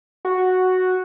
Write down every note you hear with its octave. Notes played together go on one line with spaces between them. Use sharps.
F#4